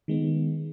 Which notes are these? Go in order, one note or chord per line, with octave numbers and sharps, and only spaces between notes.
D#3 G#3 B3